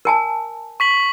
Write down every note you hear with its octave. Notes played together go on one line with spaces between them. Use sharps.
A#4 G#5 A5
C#6 B6 F#7